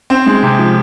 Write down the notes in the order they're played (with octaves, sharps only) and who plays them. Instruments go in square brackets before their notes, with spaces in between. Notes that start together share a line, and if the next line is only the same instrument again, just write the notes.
[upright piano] C4
G#3
C3
F3